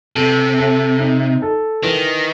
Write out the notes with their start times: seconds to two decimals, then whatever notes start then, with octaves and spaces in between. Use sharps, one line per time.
0.15 C3 A4
0.58 A4
1.00 D#4
1.42 A4
1.83 D#3 E3